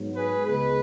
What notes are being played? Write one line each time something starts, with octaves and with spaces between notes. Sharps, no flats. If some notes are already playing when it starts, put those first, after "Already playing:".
Already playing: G#2 F#3 B3
G#4 B4
C#2 C#3 G#3 B3 G#4 B4